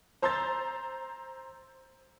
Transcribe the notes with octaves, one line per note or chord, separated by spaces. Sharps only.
C5 A#5 C6 E6 G6 A6